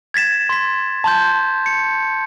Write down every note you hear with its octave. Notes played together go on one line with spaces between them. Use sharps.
G#6 A6 B6 E7
C6 B6
A5 C6 G6
C#7